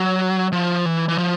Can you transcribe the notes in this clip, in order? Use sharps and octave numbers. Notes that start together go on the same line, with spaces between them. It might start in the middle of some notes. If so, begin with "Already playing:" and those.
Already playing: F#3
F3
E3
E3
F3